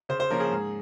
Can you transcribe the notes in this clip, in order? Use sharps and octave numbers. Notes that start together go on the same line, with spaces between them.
C#3 C5
C5
F3 A#3 C#4 A#4
G#4
G#2